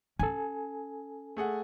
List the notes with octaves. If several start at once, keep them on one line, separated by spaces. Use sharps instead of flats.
C#4 A4 G#5
A3 G#4 F#5